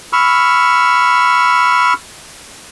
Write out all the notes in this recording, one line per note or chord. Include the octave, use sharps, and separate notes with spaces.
B5 C#6 E6 F6